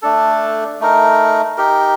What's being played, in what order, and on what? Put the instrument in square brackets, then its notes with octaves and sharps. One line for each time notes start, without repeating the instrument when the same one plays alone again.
[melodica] A3 D4 A4
A3 D#4 A#4
D#4 G4 A#4